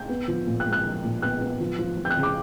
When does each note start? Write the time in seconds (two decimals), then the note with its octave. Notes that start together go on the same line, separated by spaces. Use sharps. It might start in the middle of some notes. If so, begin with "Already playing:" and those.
Already playing: G6
0.09 B3
0.28 F3
0.47 A#2
0.60 F#6
0.66 G#3
0.73 F#6
0.85 F3
1.04 A#2
1.22 B3 F#6
1.41 B3
1.60 F3
1.79 F3
1.97 F3
2.05 G6
2.10 F#6
2.16 C#3
2.23 D6